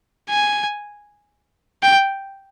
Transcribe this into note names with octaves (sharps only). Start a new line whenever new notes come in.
G#5
G5